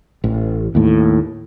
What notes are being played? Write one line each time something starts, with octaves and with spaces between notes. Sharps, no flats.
A1
D#2 A2